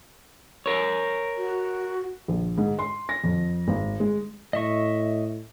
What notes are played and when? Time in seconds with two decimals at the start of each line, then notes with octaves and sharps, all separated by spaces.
0.66 A#4 C#5
1.37 F#4
2.28 A#1
2.58 G#2
2.79 C6
3.09 A#6
3.24 F2
3.68 G#1
4.00 G#3
4.53 A2 D#5 E5 C#6